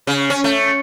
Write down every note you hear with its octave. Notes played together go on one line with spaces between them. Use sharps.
C#3
C#4
A3